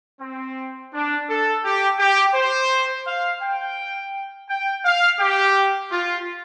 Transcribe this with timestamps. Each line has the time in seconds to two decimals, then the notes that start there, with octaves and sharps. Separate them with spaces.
0.21 C4
0.93 D4
1.28 A4
1.64 G4
1.99 G4
2.35 C5
3.06 F5
3.42 G5
4.49 G5
4.85 F5
5.20 G4
5.91 F4